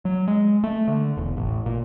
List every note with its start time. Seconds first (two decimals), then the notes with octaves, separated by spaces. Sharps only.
0.05 F#3
0.28 G#3
0.64 A3
0.88 D3
1.17 E1
1.37 A1
1.66 A#2